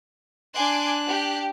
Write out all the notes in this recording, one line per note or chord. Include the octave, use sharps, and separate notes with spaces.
D4 G#5 C6 D6 F#6
G4